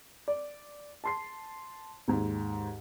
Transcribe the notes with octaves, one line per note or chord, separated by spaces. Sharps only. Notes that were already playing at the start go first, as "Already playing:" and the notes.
D5
A5 C6 C7
D#2 G#2